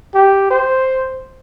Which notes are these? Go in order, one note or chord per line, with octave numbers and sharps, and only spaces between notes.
G4
C5